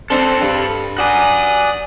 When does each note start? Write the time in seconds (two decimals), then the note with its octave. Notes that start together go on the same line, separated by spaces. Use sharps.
0.10 C4 D4 A4 C5
0.41 G2
0.98 F#4 D5 G#5 D#6 F#6